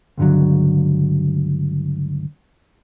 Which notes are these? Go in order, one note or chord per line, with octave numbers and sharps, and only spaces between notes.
C#2 G2 B2 D3 F#3